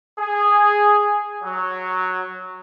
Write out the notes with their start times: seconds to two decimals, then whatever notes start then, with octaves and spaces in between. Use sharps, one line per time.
0.18 G#4
1.42 F#3